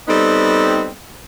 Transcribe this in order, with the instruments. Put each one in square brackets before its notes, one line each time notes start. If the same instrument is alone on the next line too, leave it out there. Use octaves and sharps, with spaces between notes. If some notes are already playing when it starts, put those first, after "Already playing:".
[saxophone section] G3 B3 C4 D#4 A4